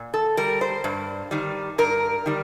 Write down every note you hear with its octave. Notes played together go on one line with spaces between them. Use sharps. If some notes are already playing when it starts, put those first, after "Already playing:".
Already playing: A#2
A4
G3 A#4
C5
G2
D#3 G3
G2 A#4
D#3 G3